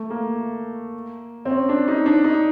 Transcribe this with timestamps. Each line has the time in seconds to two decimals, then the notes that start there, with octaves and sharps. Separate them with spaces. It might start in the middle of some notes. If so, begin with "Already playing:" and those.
Already playing: A3
0.10 A#3
1.45 C4
1.50 C#4
1.69 D4
1.88 D#4
2.06 D4
2.24 D#4